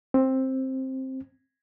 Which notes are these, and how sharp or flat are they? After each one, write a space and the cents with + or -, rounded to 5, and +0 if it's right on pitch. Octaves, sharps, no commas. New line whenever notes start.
C4 +10